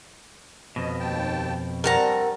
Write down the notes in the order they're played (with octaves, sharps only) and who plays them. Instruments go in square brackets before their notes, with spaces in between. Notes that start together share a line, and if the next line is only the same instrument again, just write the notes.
[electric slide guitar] F2 B2 [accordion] D#5
[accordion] D#2 G5 A5
[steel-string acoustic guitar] G2 A5 A#5 [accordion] G3 C4 [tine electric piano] A#4 F#5